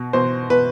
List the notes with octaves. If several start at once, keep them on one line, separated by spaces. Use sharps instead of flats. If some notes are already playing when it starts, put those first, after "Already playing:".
Already playing: B2
B2 C5
B2 B4